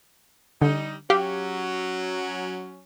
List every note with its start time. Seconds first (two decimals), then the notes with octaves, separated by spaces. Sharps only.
0.62 D3 G3 D#4
1.10 F#3 C#4 G4 F5